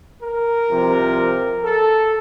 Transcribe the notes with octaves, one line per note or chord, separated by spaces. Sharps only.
A#4
C2 C3 F3
A4